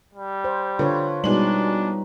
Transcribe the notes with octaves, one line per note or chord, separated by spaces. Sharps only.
G3
C5
D3 F4 B4 C#5
B2 G3 G#3 D4 D#4 B4 F#7